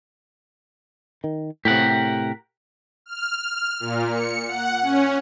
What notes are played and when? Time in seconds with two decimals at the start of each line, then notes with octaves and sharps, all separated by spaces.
1.24 D#3
1.65 A2 C3 G4 A#4 F#5
3.06 F6
3.80 A#2
4.10 C#7
4.48 F#5
4.82 C#4